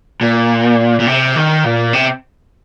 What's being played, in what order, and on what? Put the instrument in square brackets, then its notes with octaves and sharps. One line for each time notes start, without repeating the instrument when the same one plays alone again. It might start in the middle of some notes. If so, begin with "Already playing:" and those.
[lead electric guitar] A#2
A#2
C3
D#3
A#2
C3